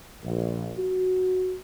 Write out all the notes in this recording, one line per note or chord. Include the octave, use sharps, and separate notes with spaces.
A#1
F#4